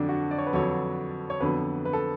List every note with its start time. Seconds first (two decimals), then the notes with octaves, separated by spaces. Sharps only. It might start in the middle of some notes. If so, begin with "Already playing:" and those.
Already playing: F2 D3 F#3 D4
0.09 F#4
0.31 D5
0.39 C#5
0.47 B4
0.53 F2 D3 F#3 C#5
1.30 C#5
1.41 F2 D3 F#3 B3 B4
1.85 B4
1.93 A4